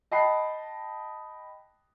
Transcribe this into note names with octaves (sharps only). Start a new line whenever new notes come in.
D#5 G5 A5 B5 F#6 C7